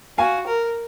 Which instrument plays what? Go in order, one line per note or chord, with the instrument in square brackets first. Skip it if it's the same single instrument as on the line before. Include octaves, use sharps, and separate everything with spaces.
[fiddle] F#4 [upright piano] F5 G#5
[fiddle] A#4